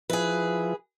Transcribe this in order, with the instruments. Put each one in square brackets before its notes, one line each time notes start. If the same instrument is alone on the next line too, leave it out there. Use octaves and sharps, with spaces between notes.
[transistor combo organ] F3 E4 [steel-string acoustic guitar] G#4 B4